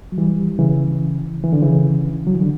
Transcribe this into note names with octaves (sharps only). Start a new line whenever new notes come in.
F#3
E3 G3
C#3 E3
E3
D3
C#3 E3
F#3
E3
D3